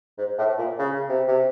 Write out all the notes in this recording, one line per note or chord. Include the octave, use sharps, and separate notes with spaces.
G#2
A2
A#2
C#3
C3
C3